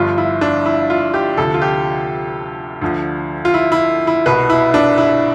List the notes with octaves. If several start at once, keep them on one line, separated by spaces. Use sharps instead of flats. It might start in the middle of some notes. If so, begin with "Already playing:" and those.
Already playing: G1 G2 F3 F4
E4
D4
E4
F4
G4
D2 C3 F3 A4
F4
G4
D2 D3 F3
F4
E4
E4
E4
C2 B2 B4
E4
D4
E4